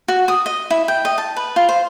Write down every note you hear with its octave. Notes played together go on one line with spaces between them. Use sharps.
F#4
D#6
D#5
E4
G5
D#5
A5
B4
F4
C5